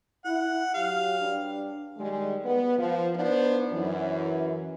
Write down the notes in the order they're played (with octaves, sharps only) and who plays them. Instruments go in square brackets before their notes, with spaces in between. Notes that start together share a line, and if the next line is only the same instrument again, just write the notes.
[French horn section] E4 [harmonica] F#5
[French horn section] F#3 G4 [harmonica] F5
[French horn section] G2 G3 D4
D#3 G3 G#3
B3
F3
B3 D4 D#4 C5
F#2 E3